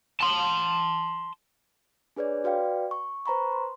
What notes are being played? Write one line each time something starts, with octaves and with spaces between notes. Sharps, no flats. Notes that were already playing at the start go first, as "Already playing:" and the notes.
A5 C6
D4 G#4 B4 C#5 D5
F#4 B4 D5 F5 G5
C#6
B4 C5 A#5 B5 C#6
C6